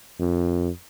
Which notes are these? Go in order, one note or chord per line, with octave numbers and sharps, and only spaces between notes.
F2